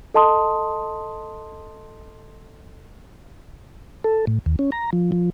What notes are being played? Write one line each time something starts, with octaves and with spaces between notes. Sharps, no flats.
A4 D#5 A5 C6 D#6
A4
A2
D#2
C#4
A#5
F3
F3